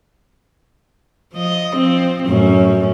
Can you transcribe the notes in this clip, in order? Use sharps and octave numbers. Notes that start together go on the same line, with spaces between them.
F3 D#5
F3 C4
F#2 A2 C#4